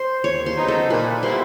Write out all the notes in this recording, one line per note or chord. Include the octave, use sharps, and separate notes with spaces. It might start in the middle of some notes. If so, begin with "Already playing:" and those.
Already playing: C5
D#2 C#5
C5
C#3 F#3 B3 D#4
A4
A#2 B4
G3 B3 E4 C5